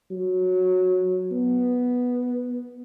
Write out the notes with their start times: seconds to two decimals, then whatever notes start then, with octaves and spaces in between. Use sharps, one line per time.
0.11 F#3
1.32 B3